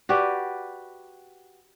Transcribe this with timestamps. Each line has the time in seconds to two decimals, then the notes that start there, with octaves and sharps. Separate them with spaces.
0.09 F#4 G4 B4 D5